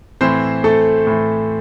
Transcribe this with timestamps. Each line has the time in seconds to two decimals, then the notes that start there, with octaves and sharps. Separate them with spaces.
0.21 A2 E3 C4 C5
0.64 A3 A4
1.07 A2 E3